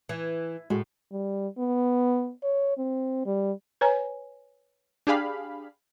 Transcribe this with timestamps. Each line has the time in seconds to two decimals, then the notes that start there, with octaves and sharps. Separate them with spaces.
0.09 E3
0.70 A2 G#3 F#4
1.12 G3
1.58 B3
2.43 C#5
2.78 C4
3.26 G3
3.81 B4 C#5 G#5 A#5
5.07 D4 G4 G#4 F5 B5